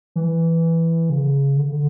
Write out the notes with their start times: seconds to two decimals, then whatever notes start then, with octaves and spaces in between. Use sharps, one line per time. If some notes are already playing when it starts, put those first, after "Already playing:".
0.16 E3
1.10 C#3
1.57 D3
1.64 C#3
1.72 D3